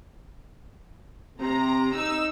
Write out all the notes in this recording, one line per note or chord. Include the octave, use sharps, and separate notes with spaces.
C3 A#5
D#4 E6